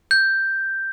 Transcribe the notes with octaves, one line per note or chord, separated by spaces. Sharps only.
G6